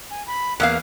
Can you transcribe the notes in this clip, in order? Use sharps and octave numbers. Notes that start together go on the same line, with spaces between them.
G#5
B5
E2 A#3 F5 F#6